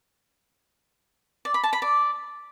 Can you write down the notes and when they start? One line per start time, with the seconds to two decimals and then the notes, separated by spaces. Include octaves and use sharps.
1.45 D5
1.54 B5
1.63 A5
1.73 B5
1.82 D5